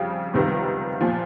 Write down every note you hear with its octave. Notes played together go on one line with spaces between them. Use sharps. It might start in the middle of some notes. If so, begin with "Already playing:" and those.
Already playing: F2 C#3 G3
C#2 C3 D#3 G3 B3
A#2 F3